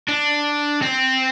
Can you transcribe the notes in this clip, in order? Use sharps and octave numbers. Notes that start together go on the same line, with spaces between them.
D4
C4